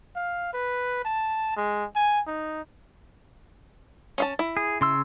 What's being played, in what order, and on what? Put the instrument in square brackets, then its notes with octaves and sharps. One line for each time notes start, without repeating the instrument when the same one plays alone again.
[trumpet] F5
B4
A5
G#3
G#5
D#4
[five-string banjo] C#4 F5 A5
E4
[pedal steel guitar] G#4
C#3 C6 E6